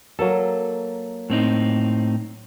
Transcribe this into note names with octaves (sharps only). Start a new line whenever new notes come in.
F#3 A#3 A4
A2 C4 D#4